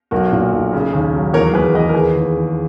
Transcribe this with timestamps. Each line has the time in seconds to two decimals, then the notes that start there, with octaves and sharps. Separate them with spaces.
0.11 B1 F#4 A#4
0.32 A#2
0.53 B1
0.73 C#3
0.93 D#2
1.13 F#3
1.33 E2 A#4 C#5
1.54 E2 G#4 B4
1.75 E2 B4 D#5
1.89 A#4
1.94 D#2 G#4 B4
2.15 D#2
2.36 D#3